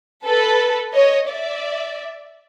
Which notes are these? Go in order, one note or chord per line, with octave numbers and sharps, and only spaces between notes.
A4 B4
C#5 D#5
D5 E5